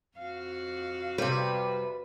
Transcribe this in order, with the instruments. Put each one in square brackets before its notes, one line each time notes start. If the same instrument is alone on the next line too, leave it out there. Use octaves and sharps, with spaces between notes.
[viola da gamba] F2 F#4 [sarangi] F5
[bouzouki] C3 G3 [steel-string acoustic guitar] B4